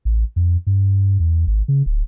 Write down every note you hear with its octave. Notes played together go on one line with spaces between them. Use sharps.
A1
F2
G2
E2
G#1
C#3
D1